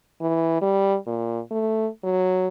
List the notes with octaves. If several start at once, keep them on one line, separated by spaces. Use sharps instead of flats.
E3
G3
A#2
A3
F#3